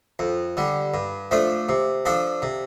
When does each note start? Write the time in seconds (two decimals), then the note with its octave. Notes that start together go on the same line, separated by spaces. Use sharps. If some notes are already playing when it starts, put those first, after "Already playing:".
0.19 F2
0.57 D3 G3
0.94 G2
1.31 F3 A3 D4
1.69 C3
2.05 F3 D4 A4
2.42 C3